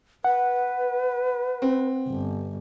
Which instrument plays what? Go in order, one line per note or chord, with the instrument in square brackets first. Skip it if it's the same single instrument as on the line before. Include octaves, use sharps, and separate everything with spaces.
[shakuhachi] B4 [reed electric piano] F#5
[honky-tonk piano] C4
[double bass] G1